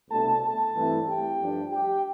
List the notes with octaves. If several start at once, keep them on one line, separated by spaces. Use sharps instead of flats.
C2 B2 A3 D4 A4 A5
A4 A5
G2 E3 A3 C4 E4
G4 G5
G2 F3 A3 D4
G4 G5